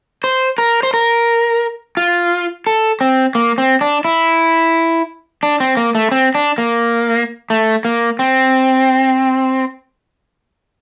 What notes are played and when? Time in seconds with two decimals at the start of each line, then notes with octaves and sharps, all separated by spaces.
0.24 C5
0.58 A#4
0.83 C5
0.94 A#4
1.97 F4
2.67 A4
3.01 C4
3.35 A#3
3.58 C4
3.81 D4
4.05 E4
5.43 D4
5.60 C4
5.77 A#3
5.95 A3
6.11 C4
6.35 D4
6.58 A#3
7.50 A3
7.85 A#3
8.19 C4